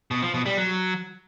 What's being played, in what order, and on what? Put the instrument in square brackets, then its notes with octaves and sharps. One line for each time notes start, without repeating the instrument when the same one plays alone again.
[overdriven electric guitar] B2
F3
B2
G3
F#3